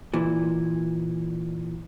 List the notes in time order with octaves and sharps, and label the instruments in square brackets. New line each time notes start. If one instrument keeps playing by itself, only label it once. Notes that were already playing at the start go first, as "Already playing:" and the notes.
[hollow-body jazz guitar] A#2 E3